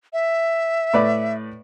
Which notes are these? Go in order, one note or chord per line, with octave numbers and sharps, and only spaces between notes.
E5
A2 B4 D5